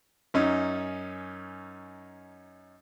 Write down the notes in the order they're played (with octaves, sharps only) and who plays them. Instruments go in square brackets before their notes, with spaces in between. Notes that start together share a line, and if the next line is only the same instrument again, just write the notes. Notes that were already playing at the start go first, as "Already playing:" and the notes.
[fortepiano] F#2 C#4 D#4